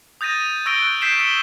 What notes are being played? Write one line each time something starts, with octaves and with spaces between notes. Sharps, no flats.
D#6 G6 A6 A#6 D#7
C#6 E6 G6 A#6 D7 G7
F#6 G6
E6 G6 B6 C7 E7
E6 B6 C#7 G7